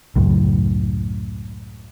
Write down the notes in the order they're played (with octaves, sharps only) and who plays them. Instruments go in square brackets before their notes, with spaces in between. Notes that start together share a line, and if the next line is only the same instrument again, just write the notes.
[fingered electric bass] C#2 F#2 A2